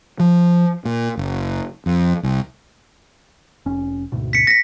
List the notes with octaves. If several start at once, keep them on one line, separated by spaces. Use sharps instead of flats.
F3
A#2
F#1
F2
C2
F1 C#4
D2 G#2 B2
B6 C#7
A#6 B6